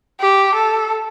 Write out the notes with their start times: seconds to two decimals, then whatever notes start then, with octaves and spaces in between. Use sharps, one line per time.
0.20 G4
0.55 A4